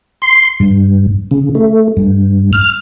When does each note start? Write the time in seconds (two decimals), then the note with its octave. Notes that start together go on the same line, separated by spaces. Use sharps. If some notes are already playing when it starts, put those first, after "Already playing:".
0.22 C6
0.60 G2
1.31 C#3
1.55 A3
1.97 G2
2.53 F6